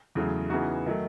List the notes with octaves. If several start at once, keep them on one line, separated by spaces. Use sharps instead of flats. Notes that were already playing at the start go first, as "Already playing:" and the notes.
E2 C#3 F#3 A3
C#3 E3 B3 D#4 F#4
D#3 F#3 A3